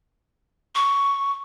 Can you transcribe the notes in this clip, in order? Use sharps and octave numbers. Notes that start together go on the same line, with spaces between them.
C#6